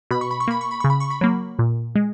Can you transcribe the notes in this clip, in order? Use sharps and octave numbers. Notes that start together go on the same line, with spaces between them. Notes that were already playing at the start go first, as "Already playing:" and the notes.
B2 B5
C#6
B5
C#6
A#3 B5
C#6
B5
C#3 C#6
B5
C#6
B5
F#3 A#3
A#2
G#3